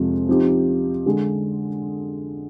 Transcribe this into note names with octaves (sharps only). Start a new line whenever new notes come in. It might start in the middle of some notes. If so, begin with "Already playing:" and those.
Already playing: F2 C3 F3 G#3
F3 C4 D#4 G4
D3 G#3 D4